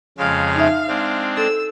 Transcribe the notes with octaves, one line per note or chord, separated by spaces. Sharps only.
F2 C#3 G#3 F5
D#4 E5
G#3 C4 D4
A4 E6